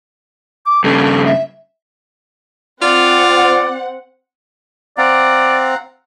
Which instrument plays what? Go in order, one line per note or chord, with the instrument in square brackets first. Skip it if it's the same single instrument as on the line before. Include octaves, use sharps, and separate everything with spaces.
[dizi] D6
[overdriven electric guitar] G2 C#3 [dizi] A4
[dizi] E5
[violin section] C4 F#5 [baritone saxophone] F4 [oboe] D5
[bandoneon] C4 [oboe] D5 [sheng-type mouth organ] F5 F#5 A#5